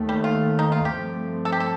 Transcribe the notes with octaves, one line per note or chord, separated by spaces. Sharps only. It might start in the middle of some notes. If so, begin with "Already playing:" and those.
Already playing: D#2 D#3 A3
G3
F4
D#4
F4
G2 F3 A3 C4 G4
A4
G4
A4